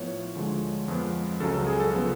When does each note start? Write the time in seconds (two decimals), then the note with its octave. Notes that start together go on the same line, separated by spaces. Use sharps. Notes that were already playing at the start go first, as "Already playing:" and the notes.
Already playing: A2 F3 B3 C#5
0.35 D2 D3 F3 G#3
0.88 F2 F3 G#3 B3
1.40 C#2 C#3 F#3 A4
1.54 A4
1.67 G#4
1.80 A4
1.93 C#3 F3 B3